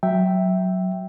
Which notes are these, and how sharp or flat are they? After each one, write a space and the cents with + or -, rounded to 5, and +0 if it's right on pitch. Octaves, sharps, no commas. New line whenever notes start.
F#3 +0 E5 +0 G5 -5